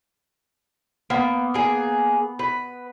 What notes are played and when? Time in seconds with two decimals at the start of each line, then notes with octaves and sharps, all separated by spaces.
1.10 A#3 B3
1.54 A#3 G#4
2.39 B4